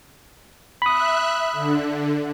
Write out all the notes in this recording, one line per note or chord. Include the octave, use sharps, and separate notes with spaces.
E5 B5 D#6 F#6
D3